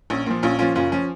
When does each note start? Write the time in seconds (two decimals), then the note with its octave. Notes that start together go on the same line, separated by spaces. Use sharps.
0.10 A#1 C#4
0.26 A#2 F3
0.43 A#1 C#4 F4
0.59 A#2 F3 C#4 F4
0.75 F#1 C#4 F4
0.92 F3 C#4